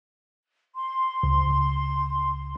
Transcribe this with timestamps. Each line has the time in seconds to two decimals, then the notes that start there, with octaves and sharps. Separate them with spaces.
0.75 C6
1.23 C#2